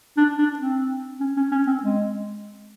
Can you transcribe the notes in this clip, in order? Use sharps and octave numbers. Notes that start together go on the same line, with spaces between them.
D4
D4
C4
C#4
C#4
C#4
C4
G#3